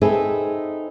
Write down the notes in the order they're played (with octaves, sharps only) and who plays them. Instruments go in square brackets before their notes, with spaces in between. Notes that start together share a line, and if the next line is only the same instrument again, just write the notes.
[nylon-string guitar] C4 D#4 G#4 A4 B4 E5